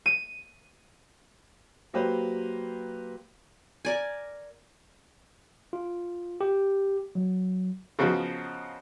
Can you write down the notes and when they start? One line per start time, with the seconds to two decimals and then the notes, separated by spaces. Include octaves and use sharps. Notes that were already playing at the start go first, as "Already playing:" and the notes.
0.06 D#7
1.93 F#3 A#3 G4 B4 C5
3.85 A#4 D5 G#5
5.73 F4
6.41 G4
7.15 F#3
7.99 C#3 F3 B3 D#4 F#4